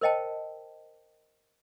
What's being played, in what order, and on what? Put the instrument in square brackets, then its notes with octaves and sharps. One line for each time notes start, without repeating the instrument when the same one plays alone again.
[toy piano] A#4 C5 D#5 G5 A5